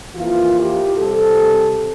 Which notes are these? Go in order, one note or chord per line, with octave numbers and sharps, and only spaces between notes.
F2 E3 A#3 F4
G4
C3 G3 C4 A4